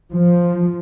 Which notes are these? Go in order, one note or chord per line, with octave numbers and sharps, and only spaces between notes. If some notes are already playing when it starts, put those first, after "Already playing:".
F3